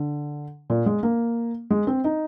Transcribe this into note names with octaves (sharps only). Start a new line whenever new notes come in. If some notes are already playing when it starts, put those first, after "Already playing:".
Already playing: D3
A#2
G#3
A#3
G#3
C4
D#4